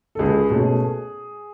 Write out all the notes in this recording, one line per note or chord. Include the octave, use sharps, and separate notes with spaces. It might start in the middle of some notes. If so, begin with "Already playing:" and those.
A4
C#2 G#4
B2 A3 C#4